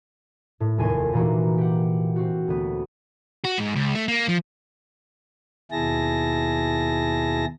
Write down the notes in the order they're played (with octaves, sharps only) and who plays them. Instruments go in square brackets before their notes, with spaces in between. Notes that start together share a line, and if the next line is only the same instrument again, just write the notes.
[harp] A2
F1 D#2 G#5 C6 D#7
A#2 E3 A#3 F#4
G4 F#5
C4 F#4
D2 B3
[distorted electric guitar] F#4
G#2
C#2
A3
A#3
F3
[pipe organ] D#2 B2 E4 G#4 A5 A#6